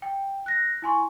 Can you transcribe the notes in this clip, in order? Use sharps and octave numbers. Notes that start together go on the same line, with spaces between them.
G5
F#6 A#6
E4 G#5 C6 C#6